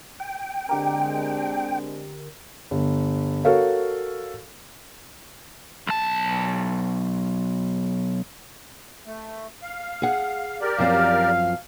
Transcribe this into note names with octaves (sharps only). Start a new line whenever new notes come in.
G5
D3 G#3 C4 D4 G4 A#4
G1
F#4 A4 A#4 C#5 F5
B1 A5
A3
F5
G#4 F#5
G4 A#4 D5
F#2 F3 C4 F5